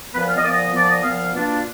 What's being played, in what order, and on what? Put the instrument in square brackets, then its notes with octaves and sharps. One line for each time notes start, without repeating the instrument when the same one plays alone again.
[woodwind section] A#2 F3 B3 B4
F5
D#5
A#2 F3 B3 D5
D#5
A#2 F3 B3 D5
D#5
A#2 F3 B3 F5
B2 A#3 D4 F4